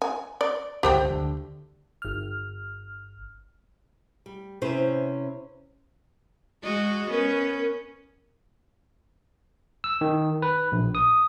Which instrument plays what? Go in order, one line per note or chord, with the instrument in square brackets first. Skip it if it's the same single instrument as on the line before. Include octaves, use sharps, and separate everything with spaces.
[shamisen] G#5
D5
[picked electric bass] G1 C#2 D3 [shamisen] G4 C5 G5
[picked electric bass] D2 D3
[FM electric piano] G1 F6
[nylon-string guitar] G3
C3 C#4 E4 B4 C5
[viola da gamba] G#3 F#4 D#5
[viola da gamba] B3 C#4 [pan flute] A#4
[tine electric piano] E6
D#3
B4
A#1
D#6